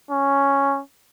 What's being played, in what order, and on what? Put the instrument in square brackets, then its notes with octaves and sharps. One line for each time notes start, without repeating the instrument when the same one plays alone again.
[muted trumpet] C#4